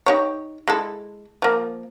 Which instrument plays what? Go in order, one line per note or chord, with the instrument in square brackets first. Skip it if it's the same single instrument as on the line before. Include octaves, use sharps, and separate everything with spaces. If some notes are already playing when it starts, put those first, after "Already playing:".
[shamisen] D#4 G4 C#5
G#3 E4 A4
F3 A#3